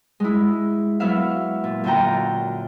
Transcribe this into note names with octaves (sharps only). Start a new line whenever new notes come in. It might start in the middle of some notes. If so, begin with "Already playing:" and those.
G#3 E4
F#3 B3 E4 E5 F5
A#2
F#2 D3 F4 G5 A#5